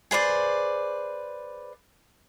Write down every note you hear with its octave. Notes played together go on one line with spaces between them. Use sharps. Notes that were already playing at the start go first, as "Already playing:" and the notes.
G#4 B4 C5 D5